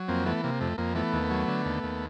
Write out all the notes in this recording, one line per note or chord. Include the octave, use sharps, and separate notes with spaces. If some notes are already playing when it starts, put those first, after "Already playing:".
Already playing: F#3
F2 A#3 C4
E3 A3 B3
C3 A#3
F2 A3
F2 A#3
E3 A3 B3
D#2
F#3
D3
D#2
D#2